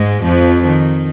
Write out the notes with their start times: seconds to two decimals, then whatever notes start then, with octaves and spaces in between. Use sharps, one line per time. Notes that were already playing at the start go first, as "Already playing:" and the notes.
Already playing: G#2 G#3
0.23 F2 F3
0.65 D#3